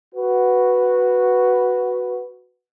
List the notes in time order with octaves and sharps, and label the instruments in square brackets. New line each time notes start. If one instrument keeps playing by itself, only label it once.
[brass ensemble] F#4 B4